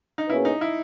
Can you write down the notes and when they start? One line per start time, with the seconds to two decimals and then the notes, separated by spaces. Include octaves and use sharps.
0.18 D#4
0.29 B2 A#3 C#4 E4 G#4 B4
0.45 D#4
0.61 E4